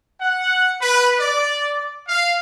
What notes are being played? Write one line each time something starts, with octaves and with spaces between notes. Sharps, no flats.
F#5
B4
D5
F5